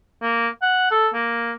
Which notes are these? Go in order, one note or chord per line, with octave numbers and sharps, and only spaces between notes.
A#3
F#5
A4
A#3